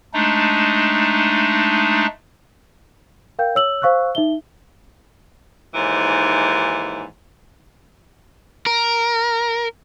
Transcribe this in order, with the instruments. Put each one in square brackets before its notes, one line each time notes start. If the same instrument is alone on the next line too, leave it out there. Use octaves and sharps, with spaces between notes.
[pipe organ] G#3 A3 D4 D#4
[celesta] A#4 F5 G5 G6
C#5 E6 F#7
C5 F5 C#6 E6 F#6
D#4 E5 G7
[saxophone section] D#2 G#2 E3
[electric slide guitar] A#4